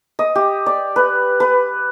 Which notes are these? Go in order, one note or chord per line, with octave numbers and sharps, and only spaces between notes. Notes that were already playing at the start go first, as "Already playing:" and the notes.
D#5
G4
D5
B4
B4